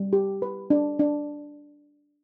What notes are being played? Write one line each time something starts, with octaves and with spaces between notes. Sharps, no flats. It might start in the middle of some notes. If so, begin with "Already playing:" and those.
Already playing: G3
G4
B4
D4
D4